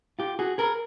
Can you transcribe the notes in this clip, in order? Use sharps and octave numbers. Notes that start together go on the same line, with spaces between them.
F4 G4
F#4 G#4
G#4 A#4